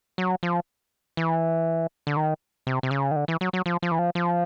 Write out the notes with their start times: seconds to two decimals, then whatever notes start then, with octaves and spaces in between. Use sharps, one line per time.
0.18 F#3
0.43 F3
1.17 E3
2.07 D3
2.17 D#3
2.67 C3
2.83 C3
2.91 C#3
3.11 D#3
3.16 D3
3.28 E3
3.41 F#3
3.53 F#3
3.66 F3
3.82 F3
3.91 E3
3.99 F3
4.15 F3